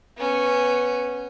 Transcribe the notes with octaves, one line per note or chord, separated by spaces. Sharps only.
B3 C#4